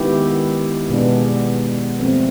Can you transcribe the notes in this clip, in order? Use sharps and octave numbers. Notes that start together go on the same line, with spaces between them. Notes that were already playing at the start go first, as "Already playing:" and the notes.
Already playing: D#3 G#3 B3 E4 G4
B2 G#3 B3 D4
F3 A3 C4